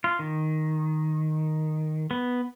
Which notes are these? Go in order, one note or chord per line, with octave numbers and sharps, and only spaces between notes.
F4
D#3
B3